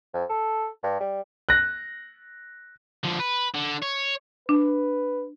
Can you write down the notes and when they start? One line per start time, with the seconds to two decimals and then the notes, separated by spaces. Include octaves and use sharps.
0.14 F2
0.29 A4
0.83 G2
1.01 G3
1.49 F#6 A#6
3.04 D3 F3
3.20 B4
3.55 D3
3.83 C#5
4.49 D4 B4